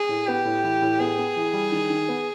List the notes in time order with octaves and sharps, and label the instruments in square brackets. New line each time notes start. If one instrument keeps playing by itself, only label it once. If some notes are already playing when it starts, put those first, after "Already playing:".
Already playing: [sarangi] G#4
[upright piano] A2
[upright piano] B3 [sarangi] G4
[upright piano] A2
E3
A2
[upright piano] B3 [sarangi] G#4
[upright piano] B3
E3
G3
D#3
D#3
B3